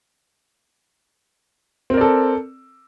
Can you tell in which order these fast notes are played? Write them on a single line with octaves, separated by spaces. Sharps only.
C4 A#4 D5 A4